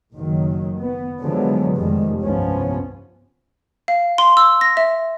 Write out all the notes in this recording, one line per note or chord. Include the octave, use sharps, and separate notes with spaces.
F#1 D#3 F#3
B3
D3 F3 F#3 G#3 B3
F1 F2 D#3 G3 G#3
C2 G2 F3 B3 C#4
F5
C6
E6
A#6
E5